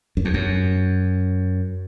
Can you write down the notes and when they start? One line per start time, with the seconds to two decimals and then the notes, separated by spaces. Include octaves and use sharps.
0.17 F#2
0.25 E2
0.34 F#2